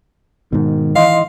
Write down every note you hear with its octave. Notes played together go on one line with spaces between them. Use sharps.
G#2 B2 D#3
E3 D#5 F5 C6